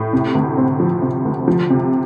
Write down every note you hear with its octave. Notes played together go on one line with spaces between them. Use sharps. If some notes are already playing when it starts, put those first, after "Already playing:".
Already playing: A2
C3
D2
C4
F3
C3
D2
F3
C3